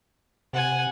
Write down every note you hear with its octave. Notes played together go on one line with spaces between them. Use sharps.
C3 F#5 G#5